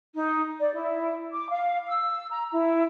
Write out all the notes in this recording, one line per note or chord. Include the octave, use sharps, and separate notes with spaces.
D#4
D5
E4
D6
F5
E6
A#5
E4